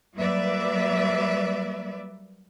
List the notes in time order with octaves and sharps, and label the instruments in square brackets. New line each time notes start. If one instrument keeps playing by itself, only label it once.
[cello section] F#3 G3 A#3 B4 D5 E5